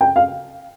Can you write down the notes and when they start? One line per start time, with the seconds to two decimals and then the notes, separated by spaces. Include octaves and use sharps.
0.01 G5
0.16 F5